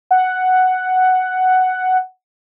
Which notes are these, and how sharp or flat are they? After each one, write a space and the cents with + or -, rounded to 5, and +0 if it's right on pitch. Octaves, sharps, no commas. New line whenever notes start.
F#5 +5